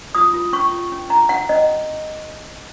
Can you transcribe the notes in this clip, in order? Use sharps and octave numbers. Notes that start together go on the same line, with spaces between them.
F4 D#6
F4
C#4 C#6
F4
C#4
C#4 A#5
C#4 F#5
C#4 D#5